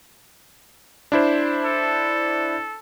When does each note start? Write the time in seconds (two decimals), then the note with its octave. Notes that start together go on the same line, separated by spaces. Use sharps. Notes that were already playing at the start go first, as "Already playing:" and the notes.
1.12 D4 E4 C5
1.65 A4